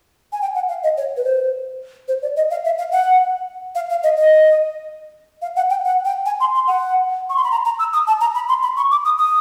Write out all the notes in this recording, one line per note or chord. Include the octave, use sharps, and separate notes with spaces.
G#5
G5
F#5
F5
D#5
C#5
B4
C5
C5
D5
D#5
F5
E5
F5
F#5
F5
F5
D#5
D#5
F5
F#5
G5
F#5
G5
G#5
C6
C6
F#5
C#6
C6
B5
A#5
A#5
E6
D#6
A5
A#5
B5
C6
B5
C#6
D6
D#6
D#6